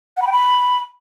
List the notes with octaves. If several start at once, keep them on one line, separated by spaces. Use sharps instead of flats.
F#5
B5
G5
B5